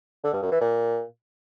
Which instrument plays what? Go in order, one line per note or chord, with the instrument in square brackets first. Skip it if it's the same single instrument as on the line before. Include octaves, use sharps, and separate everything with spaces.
[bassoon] D3
G2
F#2
E3
A#2